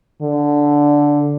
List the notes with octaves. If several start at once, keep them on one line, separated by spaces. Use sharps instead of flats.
D3